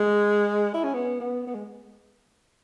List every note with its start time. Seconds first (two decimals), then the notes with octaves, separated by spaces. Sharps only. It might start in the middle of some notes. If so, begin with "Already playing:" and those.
Already playing: G#3
0.74 E4
0.84 C#4
0.94 B3
1.20 B3
1.47 B3
1.55 G#3